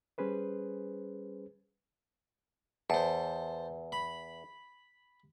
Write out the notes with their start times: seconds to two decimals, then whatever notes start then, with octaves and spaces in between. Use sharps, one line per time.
0.18 G3 C#4 G#4 B4 C5
2.90 E2 C5 A5
3.92 B5